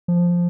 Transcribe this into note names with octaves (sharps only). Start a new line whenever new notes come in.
F3